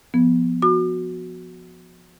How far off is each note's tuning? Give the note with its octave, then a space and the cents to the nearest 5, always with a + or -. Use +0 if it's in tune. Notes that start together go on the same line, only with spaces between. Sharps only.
F3 +0 B3 +0
F#4 -10 D6 +40